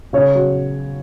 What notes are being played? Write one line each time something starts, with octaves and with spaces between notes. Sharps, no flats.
C#3 C#5
F#3